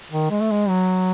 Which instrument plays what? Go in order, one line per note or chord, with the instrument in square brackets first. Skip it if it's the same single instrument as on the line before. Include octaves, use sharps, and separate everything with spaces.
[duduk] D#3
G#3
A3
G#3
F#3